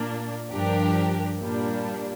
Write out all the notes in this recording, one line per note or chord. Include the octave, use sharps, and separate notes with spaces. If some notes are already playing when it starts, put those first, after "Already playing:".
Already playing: A#2 A#3 D4
G2 F3 D4 G4 A#4
A#2 G3 A#3 D4